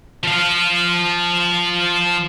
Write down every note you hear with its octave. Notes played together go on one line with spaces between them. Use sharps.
F3 F5